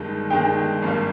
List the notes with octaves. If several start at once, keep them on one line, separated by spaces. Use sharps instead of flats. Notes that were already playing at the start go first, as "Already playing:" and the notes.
Already playing: G1 G2 D#3 G#3
G1 G2 D#3 G#3 G5
G#1 G2 G3 A#3